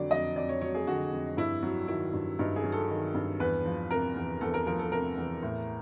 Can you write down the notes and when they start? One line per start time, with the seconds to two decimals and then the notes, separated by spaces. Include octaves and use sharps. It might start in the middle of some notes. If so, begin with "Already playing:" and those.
Already playing: F2 D3 F#3 D5
0.11 F2 D#5
0.36 F2 D5
0.49 C#5
0.61 F#3 C#5
0.75 G#4
0.87 D3 F#4
1.12 F2
1.37 G2 E4
1.63 F#3
1.88 D#3 E4
2.13 G2
2.39 G2 D#4
2.56 G#4
2.64 F#3
2.72 A4
2.89 D#3
3.15 G2
3.40 E2 B4
3.65 F3
3.90 C3 A#4
4.15 E2
4.41 E2 A4
4.54 A#4
4.67 F3 A#4
4.79 A4
4.92 C3 A#4
5.17 E2
5.42 A2